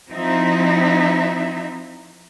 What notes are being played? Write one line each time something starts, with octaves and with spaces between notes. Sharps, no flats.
F3 C4 D#4 E4 E5